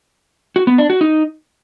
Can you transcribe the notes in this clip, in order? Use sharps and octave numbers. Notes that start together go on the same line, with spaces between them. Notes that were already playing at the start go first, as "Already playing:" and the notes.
F#4
B3
D4
F#4
D#4